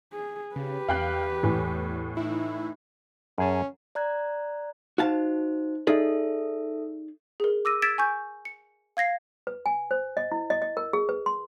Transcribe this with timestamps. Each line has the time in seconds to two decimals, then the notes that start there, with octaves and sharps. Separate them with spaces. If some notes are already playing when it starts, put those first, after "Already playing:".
0.13 G#4
0.56 C#3 G4 B4
0.89 E2 F5 G5 F#6
1.43 A2 E3
2.17 D#4 E4
3.38 F#2 C#4 G#4 A5
3.95 D5 A#5 F#6 G#6
4.98 D#4 F#4 C5 F5 A5
5.87 D#4 G#4 A4 D5 E5
7.40 G#4 A#4
7.65 D6 E6 A#6 D#7
7.82 E6 G#6 A6 B6 D7 E7
7.98 G#5 C#6 G6
8.45 C#7
8.97 F5 G#6 A#6 C7
9.47 B4
9.66 G#5
9.91 C5
10.17 D#5
10.32 E4
10.50 D#5
10.62 D#5
10.77 A#4
10.93 G#4
11.09 B4
11.26 C6